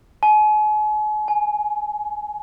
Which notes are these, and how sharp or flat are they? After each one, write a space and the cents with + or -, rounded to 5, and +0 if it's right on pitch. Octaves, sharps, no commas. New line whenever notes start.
G#5 +40
G#5 +5